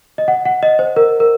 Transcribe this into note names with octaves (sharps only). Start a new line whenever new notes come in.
D#5
F#5
F#5
D#5
C5
A#4
A#4